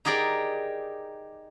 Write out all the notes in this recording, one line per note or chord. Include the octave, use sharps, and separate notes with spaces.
D#4 G4 G#4 A#4 D5